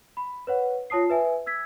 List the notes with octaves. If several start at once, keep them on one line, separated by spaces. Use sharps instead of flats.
B5
B4 C#5 F#5
F4 C#5 A5 D#6 C7
B4 E5 G#5
E6 G#6 B6